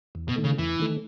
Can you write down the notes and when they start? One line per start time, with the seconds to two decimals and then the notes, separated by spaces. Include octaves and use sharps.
0.15 E2
0.29 B2
0.36 D#3 A3
0.44 C#3
0.58 E2 E3
0.80 D#3 A3